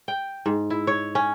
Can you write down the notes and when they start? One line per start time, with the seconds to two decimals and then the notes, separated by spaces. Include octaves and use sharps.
0.08 G5
0.46 G#2
0.70 E4
0.87 C#5
1.15 C#4